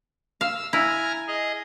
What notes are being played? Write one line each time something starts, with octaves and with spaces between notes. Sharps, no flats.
F5 E6
E4 G#5 A#5 F6
G#4 D#5